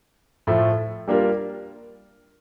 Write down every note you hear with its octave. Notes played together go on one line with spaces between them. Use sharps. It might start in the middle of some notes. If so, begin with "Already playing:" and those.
A2 F3 A3
G3 A#3 D4 F4 A#4